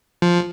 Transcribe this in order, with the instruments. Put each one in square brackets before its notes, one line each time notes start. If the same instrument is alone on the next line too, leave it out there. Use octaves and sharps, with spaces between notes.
[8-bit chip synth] F3